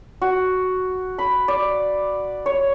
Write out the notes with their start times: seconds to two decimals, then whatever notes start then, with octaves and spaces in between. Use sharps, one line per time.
0.22 F#4
1.19 B5
1.48 D5
2.46 C#5